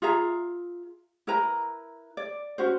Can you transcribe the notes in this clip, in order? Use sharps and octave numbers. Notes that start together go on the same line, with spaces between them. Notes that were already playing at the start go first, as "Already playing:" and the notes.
F4 G#4 E5 A#5
E4 A#4 B4 A#5
D5
C#4 F#4 C5